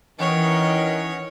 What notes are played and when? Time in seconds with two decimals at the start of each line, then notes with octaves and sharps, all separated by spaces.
0.20 D#3 E3 C#4 C#5 D#5 F#5